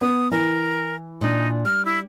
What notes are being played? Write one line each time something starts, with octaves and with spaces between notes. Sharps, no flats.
B3 D#6
E3 A#4
A#2 D4 D#4
G3 F6
E4